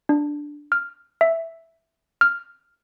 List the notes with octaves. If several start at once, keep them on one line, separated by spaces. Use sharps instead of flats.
D4
F6
E5
F6